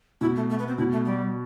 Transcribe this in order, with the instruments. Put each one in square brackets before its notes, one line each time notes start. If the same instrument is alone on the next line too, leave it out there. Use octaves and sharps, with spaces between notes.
[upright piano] B2 [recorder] E4
[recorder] A3
A3
B3
C4
[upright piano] B2 [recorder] E4
[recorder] A3
G3